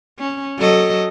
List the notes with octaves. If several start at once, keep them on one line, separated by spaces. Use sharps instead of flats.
C#4
F#3 A4 D#5